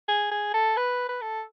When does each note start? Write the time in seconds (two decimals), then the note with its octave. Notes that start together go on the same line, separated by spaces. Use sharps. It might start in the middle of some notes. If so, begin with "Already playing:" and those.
0.08 G#4
0.31 G#4
0.54 A4
0.77 B4
1.09 B4
1.21 A4